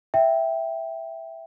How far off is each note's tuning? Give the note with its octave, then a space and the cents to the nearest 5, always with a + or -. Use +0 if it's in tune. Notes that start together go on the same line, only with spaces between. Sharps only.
E5 +0 G5 +0